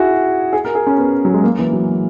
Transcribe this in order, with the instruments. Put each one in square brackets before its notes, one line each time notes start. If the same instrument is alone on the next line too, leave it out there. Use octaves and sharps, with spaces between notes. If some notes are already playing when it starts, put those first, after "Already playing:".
Already playing: [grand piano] E4 F#4 G#4
G#4
A#4
G#4
C#4
B3
F#3
G#3
A#3
E3
F#3